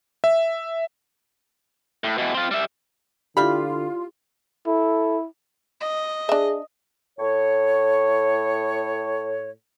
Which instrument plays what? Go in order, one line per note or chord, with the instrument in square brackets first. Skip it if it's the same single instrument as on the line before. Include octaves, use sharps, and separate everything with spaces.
[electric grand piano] E5
[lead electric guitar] A2
B2 E3
C4 F4
G3 E5
[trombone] D3 [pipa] G3 F5 B5 [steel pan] E4 G4 [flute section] F4
[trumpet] E4 [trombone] A4
[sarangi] D#5
[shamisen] D4 E5 [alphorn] G#4
[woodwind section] A2 C#5